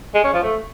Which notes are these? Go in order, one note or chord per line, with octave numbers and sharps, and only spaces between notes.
G#3
C#4
F3
A3